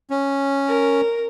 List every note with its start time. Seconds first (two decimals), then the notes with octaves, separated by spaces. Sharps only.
0.10 C#4
0.68 A#4